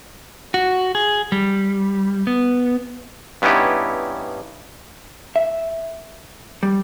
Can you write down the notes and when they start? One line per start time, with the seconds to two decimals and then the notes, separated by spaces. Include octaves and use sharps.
0.54 F#4
0.95 G#4
1.32 G3
2.27 B3
3.42 G2 B3 C#4 D#4 E4 G4
5.36 E5
6.63 G3